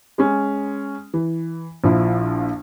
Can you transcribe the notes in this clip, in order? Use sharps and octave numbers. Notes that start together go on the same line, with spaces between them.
G#3 C#4
E3
A#1 F3 E4